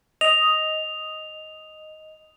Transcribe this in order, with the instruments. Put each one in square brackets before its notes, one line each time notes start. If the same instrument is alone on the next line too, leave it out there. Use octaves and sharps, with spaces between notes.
[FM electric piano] D#5 [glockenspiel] F7